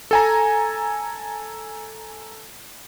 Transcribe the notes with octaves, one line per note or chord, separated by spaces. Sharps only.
A4 G#5 A#5